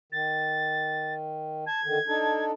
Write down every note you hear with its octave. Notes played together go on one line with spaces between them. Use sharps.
D#3 A6
A5 G#6
D3 D#3
D4 D#4 A4